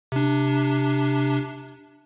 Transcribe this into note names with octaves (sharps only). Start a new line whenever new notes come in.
C3 D4